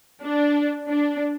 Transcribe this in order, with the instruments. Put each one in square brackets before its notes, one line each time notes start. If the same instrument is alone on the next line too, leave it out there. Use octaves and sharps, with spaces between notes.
[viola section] D4
D4